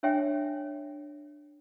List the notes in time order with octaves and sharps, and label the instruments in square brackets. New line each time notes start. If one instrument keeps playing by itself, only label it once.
[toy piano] D4 C#5 E5 G5 G#5